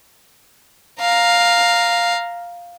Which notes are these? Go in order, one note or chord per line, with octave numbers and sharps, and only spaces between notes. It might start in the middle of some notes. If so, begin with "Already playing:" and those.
F5 A#5